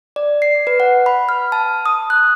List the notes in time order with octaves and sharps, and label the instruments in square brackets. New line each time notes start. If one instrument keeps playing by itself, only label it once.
[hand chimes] D5
C7
B4
F#5
B5
F6
A5
D#6
F#6